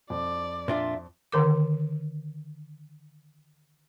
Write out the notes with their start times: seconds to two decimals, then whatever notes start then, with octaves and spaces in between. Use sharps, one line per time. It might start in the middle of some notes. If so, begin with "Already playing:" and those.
0.10 F2 D5
0.68 A#2 D4 F4 E5
1.32 D3 D#3 A#4 D6